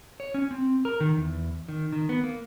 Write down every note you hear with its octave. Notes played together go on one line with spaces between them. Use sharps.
C#5
C#4
C4
A#4
D#3
E2
D#3
D#3
B3
A#3